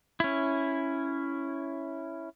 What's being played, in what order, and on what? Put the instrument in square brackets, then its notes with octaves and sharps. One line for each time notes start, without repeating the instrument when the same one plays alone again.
[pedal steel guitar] C#4 E4